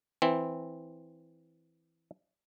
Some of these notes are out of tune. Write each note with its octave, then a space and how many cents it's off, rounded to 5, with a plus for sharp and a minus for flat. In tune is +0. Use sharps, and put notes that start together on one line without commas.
E3 +0 C4 +0